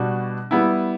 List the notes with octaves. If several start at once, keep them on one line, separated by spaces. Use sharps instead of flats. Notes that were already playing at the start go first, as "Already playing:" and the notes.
Already playing: B2 G3 D4 F#4
G3 B3 E4